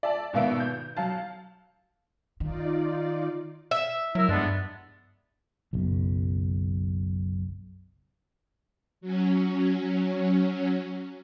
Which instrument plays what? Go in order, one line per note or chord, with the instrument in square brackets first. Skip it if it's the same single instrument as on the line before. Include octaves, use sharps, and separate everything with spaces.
[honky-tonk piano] D5 E5 A5
G#1 B2 A#3 B3 E5 D7
G6
F#3 F5 A5
[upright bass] D#3 [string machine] D#4 F4 D5
[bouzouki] E5
[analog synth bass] F#3 [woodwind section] E4 A#4 E6
[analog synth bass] G2 [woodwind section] G#3 B3 D4
[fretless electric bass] F#1 B1
[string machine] F#3 C#4